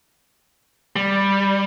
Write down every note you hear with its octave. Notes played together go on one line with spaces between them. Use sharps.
G3